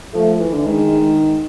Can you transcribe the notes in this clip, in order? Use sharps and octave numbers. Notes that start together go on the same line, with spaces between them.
F3 A3
E3
D3
D#3 G#3